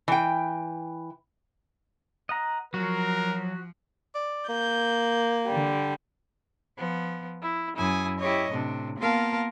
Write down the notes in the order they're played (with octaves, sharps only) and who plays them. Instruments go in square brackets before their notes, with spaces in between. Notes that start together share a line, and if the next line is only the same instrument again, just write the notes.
[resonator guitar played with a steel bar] E3 G5
[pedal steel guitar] D#5 F#5 A#5
[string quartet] F3 [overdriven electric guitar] F#3 [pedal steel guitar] F#4 [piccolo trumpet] A#4
[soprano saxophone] D5
[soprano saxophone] A#3 [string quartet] G6
[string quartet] D3 G3
F3 B3
E4
F#2 E4 G#5 D#6
E4 G4 C#5 D#5
A2 C3 D4
A#3 B3 F4 A#4 F5 A5